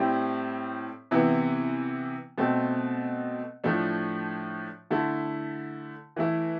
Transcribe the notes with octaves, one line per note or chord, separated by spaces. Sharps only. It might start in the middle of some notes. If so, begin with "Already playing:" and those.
Already playing: A2 G3 C4 E4
C3 E3 B3 E4
B2 A3 C4
A2 F3 A3 D4
D3 A3 E4
E3 A3 E4